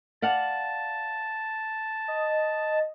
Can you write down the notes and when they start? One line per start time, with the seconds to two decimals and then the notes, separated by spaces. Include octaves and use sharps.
0.22 D5 F5 F#5 A5
2.08 D#5